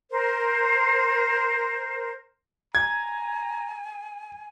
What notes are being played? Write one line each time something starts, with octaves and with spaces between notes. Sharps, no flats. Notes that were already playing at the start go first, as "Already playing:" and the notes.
A#4 C5
G#5 A#5 G#6